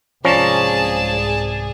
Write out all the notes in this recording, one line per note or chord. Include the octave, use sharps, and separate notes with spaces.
C2 G#2 F3 C#4 G#4 D5 A5 A#5